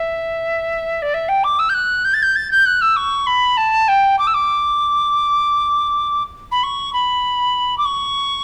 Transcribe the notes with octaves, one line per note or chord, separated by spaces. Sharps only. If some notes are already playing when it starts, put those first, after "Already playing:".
Already playing: E5
D5
E5
G5
D6
E6
G6
F#6
G6
A6
G6
A6
G6
F#6
E6
C#6
B5
A5
G5
D6
E6
D6
B5
C#6
B5
D6
C#6